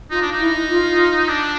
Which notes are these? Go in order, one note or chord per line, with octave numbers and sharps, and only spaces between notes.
D#4 F4
D4
D#4
E4
F4
D4